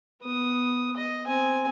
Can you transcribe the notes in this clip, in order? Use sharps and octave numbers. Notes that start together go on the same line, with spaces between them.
B3 D#6
D#5
C4 G#5